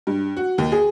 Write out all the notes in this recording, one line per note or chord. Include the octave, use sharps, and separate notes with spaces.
G2
F#4
D#2
G#4